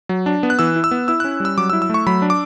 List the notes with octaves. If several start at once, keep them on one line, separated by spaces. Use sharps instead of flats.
F#3
D4
B3
F#6
E3 E6
E4
E6
B3
E4 E6
F#6
C#4
G3 E6
F#3 D6
E6
E4
E6
A3 C#6
F#3 B5
D4
D6